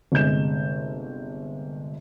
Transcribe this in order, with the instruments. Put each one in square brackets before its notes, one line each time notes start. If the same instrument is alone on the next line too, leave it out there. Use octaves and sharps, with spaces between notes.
[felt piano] G1 C3 G#3 G6 E7